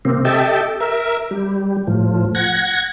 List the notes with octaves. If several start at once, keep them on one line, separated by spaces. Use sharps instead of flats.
C3 A#3 C4
G4 A4 D#5 E5 G5 A5
A#4 E5
G3
A2 F3
F#5 G#6 A#6